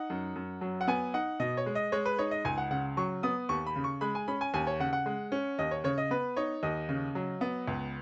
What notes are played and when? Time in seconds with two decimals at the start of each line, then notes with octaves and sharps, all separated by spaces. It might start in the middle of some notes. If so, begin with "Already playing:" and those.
Already playing: D#4 F#5
0.10 F#2
0.36 F#2
0.61 F#3
0.81 F#5
0.87 B3 G#5
1.14 D#4 F#5
1.40 B2 D#5
1.57 C#5
1.66 G#3
1.75 D#5
1.92 G#3 C#5
2.05 B4
2.18 D#4 C#5
2.31 D#5
2.45 C#2 G#5
2.58 F#5
2.71 C#3 F#5
2.97 F#3 C#6
3.23 B3 D#6
3.49 D#2 C#6
3.66 B5
3.76 C#3
3.84 C#6
4.01 G#3 B5
4.15 G#5
4.28 C#4 B5
4.41 G#5
4.54 D#2 G#5
4.67 C#5
4.80 C#3 F#5
4.93 F#5
5.06 G#3
5.32 C#4
5.59 D#2 D#5
5.71 C#5
5.84 C#3 C#5
5.98 D#5
6.11 B3 B4
6.37 D#4 C#5
6.63 D#2 D#5
6.89 C#3
7.15 F#3
7.41 B3
7.68 C#2